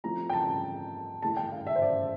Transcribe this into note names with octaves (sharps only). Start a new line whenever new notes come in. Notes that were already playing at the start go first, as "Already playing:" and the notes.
F3 A3 C4 E4 A#5
G5
A5
E3 A3 E4 A5
G5
F5
E5
C5
D5